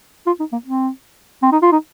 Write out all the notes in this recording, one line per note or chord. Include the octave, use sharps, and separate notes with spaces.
F4
D#4
A#3
C4
C4
D#4
F4
D#4